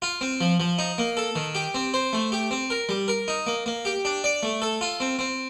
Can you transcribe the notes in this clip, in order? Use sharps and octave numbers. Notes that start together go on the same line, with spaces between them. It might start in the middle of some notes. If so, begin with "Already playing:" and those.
F4
C4
F3
F3
D#4
A#3
A4
D#3
G4
C4
C5
A3
G4
C4
A#4
G3
A#4
D#4
A#3
A#3
G4
D4
D5
A3
A4
F4
C4
C4